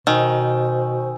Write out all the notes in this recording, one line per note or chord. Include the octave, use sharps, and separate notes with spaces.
B2 D#3 C5 G#5 E6